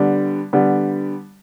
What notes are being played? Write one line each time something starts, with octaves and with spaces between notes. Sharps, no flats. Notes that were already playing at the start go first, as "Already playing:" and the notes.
Already playing: D3 G3 B3
D3 G3 B3